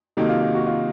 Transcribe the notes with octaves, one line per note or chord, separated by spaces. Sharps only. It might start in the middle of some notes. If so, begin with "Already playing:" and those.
C3 D#3 F#3 A#3 D#4 A4
F4
F4
F#4
F4